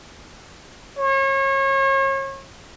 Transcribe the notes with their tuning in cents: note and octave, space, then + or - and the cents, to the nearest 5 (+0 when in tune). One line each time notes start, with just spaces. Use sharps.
C#5 -35